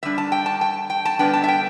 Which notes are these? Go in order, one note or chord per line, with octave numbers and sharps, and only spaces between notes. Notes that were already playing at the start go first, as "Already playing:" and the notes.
D3 G3 D4 E5
A5
G5
A5
G5
G5
A5
D3 G3 B3 D4 G5
A5
E5
G5